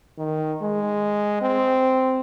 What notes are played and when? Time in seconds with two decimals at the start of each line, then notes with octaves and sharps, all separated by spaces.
0.18 D#3
0.62 G#3
1.42 C4